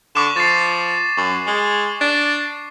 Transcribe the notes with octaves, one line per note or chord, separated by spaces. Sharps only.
D3 C#6 D6 E7
F3 A6 C7
F#2
G#3
D4